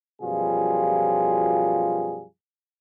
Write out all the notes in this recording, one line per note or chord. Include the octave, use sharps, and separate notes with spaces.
F#2 B2 F3 G3 F4 G#4